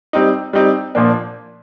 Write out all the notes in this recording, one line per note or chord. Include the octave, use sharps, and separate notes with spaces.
G3 C4 D#4
G3 C4 D#4
A#2 F3 A#3 D4